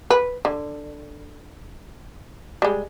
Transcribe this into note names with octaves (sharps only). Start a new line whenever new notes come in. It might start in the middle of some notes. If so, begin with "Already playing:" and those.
B4
D3
G3 G#3